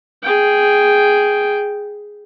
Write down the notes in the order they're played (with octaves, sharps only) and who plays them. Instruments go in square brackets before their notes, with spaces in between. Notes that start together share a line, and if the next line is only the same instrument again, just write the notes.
[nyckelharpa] G#4 G5